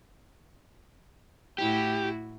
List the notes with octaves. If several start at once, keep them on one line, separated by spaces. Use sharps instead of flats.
A2 E4 F#4 G4